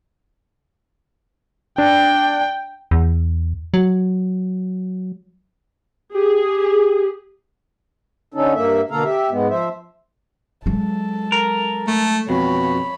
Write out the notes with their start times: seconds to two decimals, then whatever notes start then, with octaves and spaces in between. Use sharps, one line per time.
1.78 D4 G5
2.91 E2
3.74 F#3
6.14 G4 G#4
8.34 D3 C#4 D#4 A4
8.54 G2 A#3 E5
8.91 B2 D3 A#3 A4 F5 A#5
9.04 G4 E5
9.31 G#2 G#3 B3
9.50 F3 C5 E5
10.66 F#3 G#3 A4
11.32 A#4
11.87 A3
12.29 F2 B2 C#5 B5